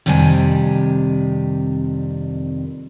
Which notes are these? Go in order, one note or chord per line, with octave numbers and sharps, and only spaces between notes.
F2 C3 D#3 G3 D4 G#5